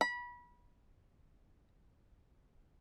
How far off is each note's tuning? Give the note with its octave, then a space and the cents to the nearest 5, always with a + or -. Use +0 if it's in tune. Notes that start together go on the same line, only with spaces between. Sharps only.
B5 -25